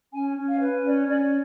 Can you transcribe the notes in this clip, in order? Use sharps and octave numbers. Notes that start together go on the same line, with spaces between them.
C#4 G#5
C#4
F5
B4
C#4 D5
C#4 D5